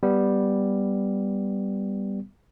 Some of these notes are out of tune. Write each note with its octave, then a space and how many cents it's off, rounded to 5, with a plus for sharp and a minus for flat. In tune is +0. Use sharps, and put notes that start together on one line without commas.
G3 +0 B3 +0